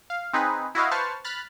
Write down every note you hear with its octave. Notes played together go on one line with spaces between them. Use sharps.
F5
C4 D#4 G#4 B4
E4 F#4 B4 D#5 F5
B4 C5 A5 C#6 F6
B5 F6 F#6 A6